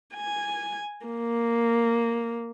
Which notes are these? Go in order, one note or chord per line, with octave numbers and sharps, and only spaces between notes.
G#5
A#3